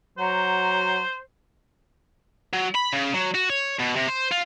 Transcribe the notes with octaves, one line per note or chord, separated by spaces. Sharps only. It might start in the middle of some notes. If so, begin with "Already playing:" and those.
F#3 F#4 C5 F#5 A#5
F#3
B5
C#3
F#3
F#4
C#5
B2
C3
C5
F4